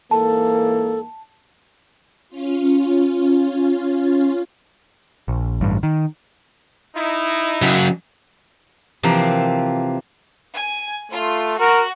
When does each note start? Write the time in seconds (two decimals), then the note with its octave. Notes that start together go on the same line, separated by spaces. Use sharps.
0.11 G#2 E3 A#3 A4 A5
2.29 C#4 F4
5.28 A#1
5.61 A1 G2
5.83 D#3
6.96 D#4 E4
7.62 C#3 F#3
9.03 C3 E3 F3 A#3 C4 A#4
10.54 G#5
11.11 A3 F4
11.59 F#4 A#4